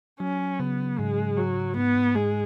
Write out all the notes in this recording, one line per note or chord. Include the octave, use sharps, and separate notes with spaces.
F#3 C#4
C#3 B3
G#2 G#3
F#3
G#2 B3
G#2
G#2 G#3